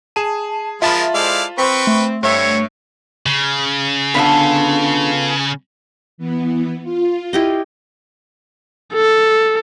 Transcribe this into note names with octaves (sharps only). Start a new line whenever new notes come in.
G#4 A5 D#7
F3 G#3 F4 A#4 E5 A5 B5
G#3 E4 A4 C5 D5 F5
C4 B4 G5 C#6 B6
A3
G2 D3 C4 C#5 E5
C#3
D3 B3 F4 A4 B5
E3 B3
F4
E4 G4 D#5
A4